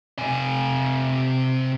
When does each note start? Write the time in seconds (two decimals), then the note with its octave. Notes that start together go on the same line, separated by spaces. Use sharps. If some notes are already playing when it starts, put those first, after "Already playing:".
0.18 C3 G#5